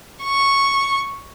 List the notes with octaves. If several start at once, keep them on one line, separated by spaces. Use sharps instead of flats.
C#6